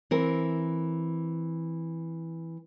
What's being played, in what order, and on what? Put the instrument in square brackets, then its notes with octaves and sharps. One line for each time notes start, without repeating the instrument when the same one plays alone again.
[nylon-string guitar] E3 C4 A#4